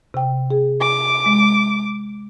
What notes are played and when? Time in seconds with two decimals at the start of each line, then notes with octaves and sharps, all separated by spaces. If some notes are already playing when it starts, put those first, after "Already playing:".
0.14 C3 G5
0.51 G#4
0.81 D6
1.26 G#3